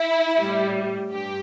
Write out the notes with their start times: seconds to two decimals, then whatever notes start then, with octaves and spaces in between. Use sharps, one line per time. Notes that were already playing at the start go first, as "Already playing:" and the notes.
Already playing: E4
0.38 A2 G3
1.11 G2 G4